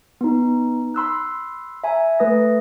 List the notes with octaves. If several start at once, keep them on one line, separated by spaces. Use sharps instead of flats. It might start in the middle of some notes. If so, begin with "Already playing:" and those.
B3 D#4
B5 C6 E6 F#6
E5 G#5 A#5
A3 B4 D#6 A#6